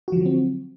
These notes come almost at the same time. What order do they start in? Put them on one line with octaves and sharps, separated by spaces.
F#4 F3 D3 F#3 C4